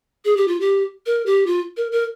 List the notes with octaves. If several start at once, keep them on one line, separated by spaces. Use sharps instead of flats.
G#4
G4
F4
G4
A#4
G4
F4
A#4
A#4